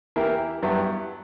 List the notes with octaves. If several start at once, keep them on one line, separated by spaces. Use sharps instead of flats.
E3 A#3 E4 G4 A#4
G2 F#3 B3 E4 G4